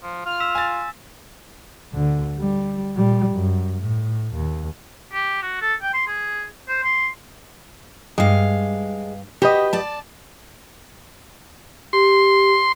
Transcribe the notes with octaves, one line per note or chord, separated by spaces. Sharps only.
F3
F4 F6
E6 B6 E7
G#5 A6
D2 D3
G3
A#2 G3
F#2
A2
D#2
G4
F#4
A4
G5
C6
G#4
C5
C6
G2 G#3 F5
F#4 G4 B4 D#5
D5 A5
G4 C6